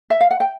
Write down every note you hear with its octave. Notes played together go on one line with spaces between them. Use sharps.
E5
F5
F#5
G5